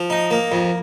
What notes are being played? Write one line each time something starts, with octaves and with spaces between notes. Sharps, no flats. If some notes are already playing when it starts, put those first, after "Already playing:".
Already playing: F3
D#4
A#3
F2